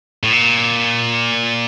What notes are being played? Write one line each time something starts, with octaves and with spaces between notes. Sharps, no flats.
A2
A#2